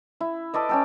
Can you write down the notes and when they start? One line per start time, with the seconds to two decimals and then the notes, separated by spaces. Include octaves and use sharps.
0.20 E4
0.54 A4 B4 D5 D#5
0.69 C#4 G4 A4